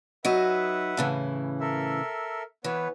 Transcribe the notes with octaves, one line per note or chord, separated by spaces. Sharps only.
F#3 D#4 B4 D#5 E5 F#5
A2 C#3 E3
A4 A#4 E5
E3 B3 B4 C#5